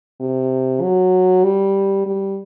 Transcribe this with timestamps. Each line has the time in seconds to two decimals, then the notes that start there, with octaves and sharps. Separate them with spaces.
0.20 C3
0.82 F#3
1.44 G3
2.06 G3